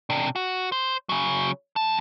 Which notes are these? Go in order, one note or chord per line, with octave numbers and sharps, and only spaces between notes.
C3 D4
F#4
C5
C#3 F#3
F2 A5